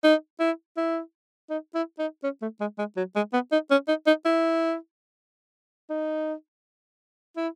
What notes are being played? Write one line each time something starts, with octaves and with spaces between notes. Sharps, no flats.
D#4
E4
E4
D#4
E4
D#4
C#4
A3
G#3
G#3
F#3
G#3
B3
D#4
C#4
D#4
D#4
E4
D#4
E4